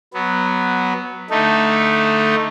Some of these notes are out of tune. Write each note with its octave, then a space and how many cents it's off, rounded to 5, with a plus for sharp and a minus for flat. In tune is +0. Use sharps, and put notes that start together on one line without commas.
F#3 +0 B3 +0
D3 +0 A3 +0 D#4 +0